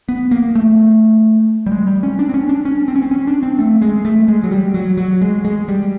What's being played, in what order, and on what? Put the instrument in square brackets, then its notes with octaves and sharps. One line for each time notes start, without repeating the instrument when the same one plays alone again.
[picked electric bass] B3
A#3
A3
G3
G#3
G3
C#4
D4
C4
C#4
D4
C#4
C4
C#4
C4
C#4
D4
C4
A3
G#3
A3
G#3
F#3
G3
F#3
F#3
G#3
G#3
G3